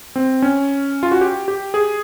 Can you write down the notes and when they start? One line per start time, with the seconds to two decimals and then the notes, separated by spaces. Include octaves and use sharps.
0.16 C4
0.42 C#4
1.03 F4
1.11 F#4
1.21 G4
1.48 G4
1.74 G#4